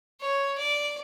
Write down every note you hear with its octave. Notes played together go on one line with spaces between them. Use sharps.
C#5
D5